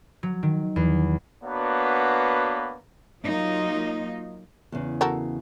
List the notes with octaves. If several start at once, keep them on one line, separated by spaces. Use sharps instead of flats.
F#3
D#3
E2
A#3 B3 D4 F#4 B4 C#5
F#3 A#3 D#4 F4
E2 C#3
F#4 A4 A#4